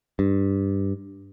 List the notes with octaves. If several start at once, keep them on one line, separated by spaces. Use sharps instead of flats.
G2